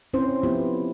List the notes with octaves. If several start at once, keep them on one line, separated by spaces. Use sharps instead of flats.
C4 C#4 E4 C5
F3 B3 E4 F4 G4